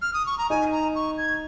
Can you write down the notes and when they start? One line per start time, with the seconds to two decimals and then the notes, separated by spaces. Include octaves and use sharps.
0.02 F6
0.14 D#6
0.26 C#6
0.38 A#5
0.50 D#4 G#5
0.72 A#5
0.95 C#6
1.18 G#6